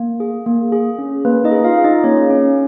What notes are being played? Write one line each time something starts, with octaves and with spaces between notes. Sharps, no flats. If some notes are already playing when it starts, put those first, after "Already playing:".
Already playing: A#3
G#4
A#3
G#4
C#4
A#3 B4
D#4 D#5
G#4
F4 F5
G#4
D#4 D#5
A#3 C#4 C#5
C#4